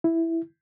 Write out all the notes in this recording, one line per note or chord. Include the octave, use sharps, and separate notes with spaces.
E4